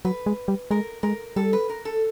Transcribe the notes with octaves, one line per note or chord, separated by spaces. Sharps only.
F#3 B4
G#3
G3
G#3 A#4
G#3 A#4
G3 A4
B4
A#4
A4